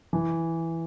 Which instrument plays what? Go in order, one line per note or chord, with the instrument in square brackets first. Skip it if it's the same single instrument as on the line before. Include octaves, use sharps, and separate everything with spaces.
[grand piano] E3